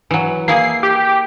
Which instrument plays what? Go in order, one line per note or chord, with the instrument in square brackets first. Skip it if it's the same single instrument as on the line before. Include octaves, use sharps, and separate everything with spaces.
[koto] E3 F#3
[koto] A#3 E4 G#4 [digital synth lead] C7
[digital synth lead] G4